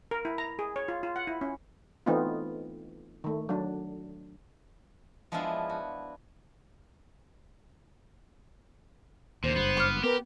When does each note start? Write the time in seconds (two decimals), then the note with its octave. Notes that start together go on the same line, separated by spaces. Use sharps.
0.11 A#4
0.25 E4
0.38 A#5
0.59 G#4
0.76 C#5
0.88 F4
1.03 F4
1.16 F#5
1.27 E4
1.41 C#4
2.06 E3 A3 B3 C4 D#4 F4
3.24 D#3 A3
3.49 F#3 D4
5.32 F3 G#3 B3 D4 E4 F4
5.70 F#4
9.44 D#2 A#2 D3 C5
9.56 F#1 G2 B3
9.77 C6 D6 F6
10.04 B3 G4 A#4 B4